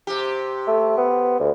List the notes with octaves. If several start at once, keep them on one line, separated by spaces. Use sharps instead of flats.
C3 G4
A3
B3
D2